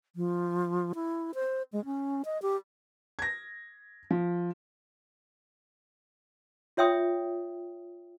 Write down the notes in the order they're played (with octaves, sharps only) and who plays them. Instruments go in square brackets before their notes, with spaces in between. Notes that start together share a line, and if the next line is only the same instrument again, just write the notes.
[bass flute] F3
E4
C5
G#3
C#4
D#5
G4
[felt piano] G#6 A#6
F3
[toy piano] F4 C#5 E5 G5 D#6